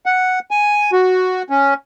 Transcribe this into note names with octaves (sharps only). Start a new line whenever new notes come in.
F#5
G#5
F#4
C#4